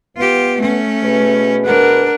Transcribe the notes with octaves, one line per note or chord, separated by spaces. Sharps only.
B3 F4 G4
A3 C#4
B2 G#4 B4
D4 A#4 F#5